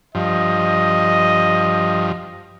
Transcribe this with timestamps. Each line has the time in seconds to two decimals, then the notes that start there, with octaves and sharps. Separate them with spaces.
0.15 G2 F3 D#5